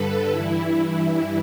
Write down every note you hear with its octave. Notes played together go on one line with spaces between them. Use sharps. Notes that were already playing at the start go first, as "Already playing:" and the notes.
Already playing: G2 D3 A4 B4
G2 E3 E4